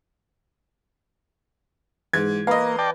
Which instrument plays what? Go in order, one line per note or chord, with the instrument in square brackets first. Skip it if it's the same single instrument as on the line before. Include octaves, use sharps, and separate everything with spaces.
[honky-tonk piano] G#2 G#6 [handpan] E3
[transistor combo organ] A#3 [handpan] B4 [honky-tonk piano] D#5 F5
[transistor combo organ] D5 G5 A5